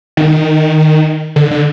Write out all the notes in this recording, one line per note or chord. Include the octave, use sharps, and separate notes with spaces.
D#3
D3
D3